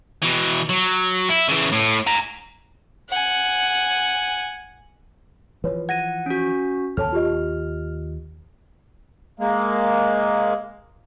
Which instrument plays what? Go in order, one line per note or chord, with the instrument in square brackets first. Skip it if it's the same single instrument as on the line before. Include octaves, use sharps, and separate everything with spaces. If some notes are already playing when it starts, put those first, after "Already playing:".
[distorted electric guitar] B2 E3
F#3
E4
C#3 E3
A2
G#5 A#5
[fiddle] F#5 G#5
[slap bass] E3 F3 [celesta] B4 C#5
[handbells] F#5 [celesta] G#6 A#6 D#7
[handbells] C#4 F#4
[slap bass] D#2 [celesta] A4 C#5 A5 [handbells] F6
[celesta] F4 G4 D#5
[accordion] G#3 A#3